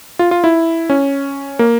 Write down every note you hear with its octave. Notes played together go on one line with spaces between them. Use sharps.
F4
F4
E4
C#4
A#3